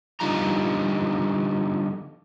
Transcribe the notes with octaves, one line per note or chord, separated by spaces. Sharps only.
D3 F3 G3 D#4 F4 A#5